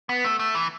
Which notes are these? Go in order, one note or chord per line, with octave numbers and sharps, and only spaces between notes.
B3
A3
A3
E3